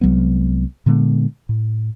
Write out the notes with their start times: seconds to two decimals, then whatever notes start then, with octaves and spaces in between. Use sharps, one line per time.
0.01 C2 F#3 G#3 B3
0.86 A#2 D3 G#3 B3
1.49 A2